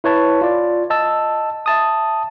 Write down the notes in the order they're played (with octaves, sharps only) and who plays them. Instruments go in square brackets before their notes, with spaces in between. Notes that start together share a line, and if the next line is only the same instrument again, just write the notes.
[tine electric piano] E4 B4 C#5 A5
F4 D5
D#5 A5 E6
E5 A5 D#6